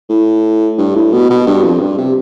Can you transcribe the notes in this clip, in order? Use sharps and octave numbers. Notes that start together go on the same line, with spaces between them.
A2
G2
A2
B2
B2
G2
F2
G2
C3